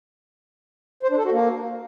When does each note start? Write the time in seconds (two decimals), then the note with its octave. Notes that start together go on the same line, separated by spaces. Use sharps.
1.03 C5
1.10 D4
1.17 A4
1.25 F#4
1.32 A#3